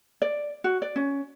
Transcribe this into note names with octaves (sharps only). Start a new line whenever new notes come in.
D5
F#4
D5
C#4